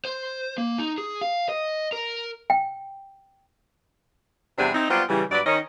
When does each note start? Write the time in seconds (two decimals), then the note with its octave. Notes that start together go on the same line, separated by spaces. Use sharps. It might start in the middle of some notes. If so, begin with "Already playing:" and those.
0.05 C5
0.58 A#3
0.78 D#4
0.98 G#4
1.21 F5
1.49 D#5
1.93 A#4
2.50 G5
4.59 E2 C3 G3 D4 G#4 C5
4.74 C4 D#4 E4
4.89 F#3 G3 B3 F4 C5 D5
5.09 C#3 E3 G3
5.31 G2 F#3 B4 D5
5.45 D#3 C#4 D#5